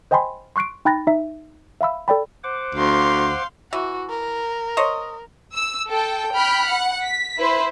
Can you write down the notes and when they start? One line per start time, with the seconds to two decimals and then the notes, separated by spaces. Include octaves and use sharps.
0.11 C5 D#5 G5 G#5 B5 C6
0.56 C6 C#6 F#6 C7 D7
0.85 D#4 G5 B5 F#6 A6 A#6
1.07 D#4 E5
1.81 E5 F5 B5 E6
2.08 A4 D5 G5 B5
2.44 C5 F#5 D6
2.75 D2 F5 C6
3.73 E3 F#4
4.10 A#4
4.77 C5 C#5 D#5
5.54 E6
5.89 A4 G5
6.34 G5 B5 F6 F#6
6.67 F#5
7.02 B6
7.37 E4 B4 C5